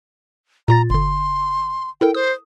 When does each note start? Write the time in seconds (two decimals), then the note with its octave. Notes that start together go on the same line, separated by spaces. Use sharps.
0.68 A#2 F4 A#5 A6
0.90 G1 D3 C6
2.01 E4 A4 A#4 G5
2.14 C5 D#6